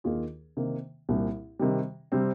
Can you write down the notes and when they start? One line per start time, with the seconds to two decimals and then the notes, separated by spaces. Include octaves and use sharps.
0.04 D#2 D#3 A#3 F4 G#4
0.57 C3 D#3 A#3
1.09 C2 A#2 G3
1.59 C3 D#3 G3
2.12 C3 G3 C4